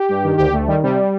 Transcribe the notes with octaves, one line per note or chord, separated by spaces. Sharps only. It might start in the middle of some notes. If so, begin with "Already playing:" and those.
Already playing: G4
G2
D#3
D2 G4
D2 A3
D#3 G3
C3 G3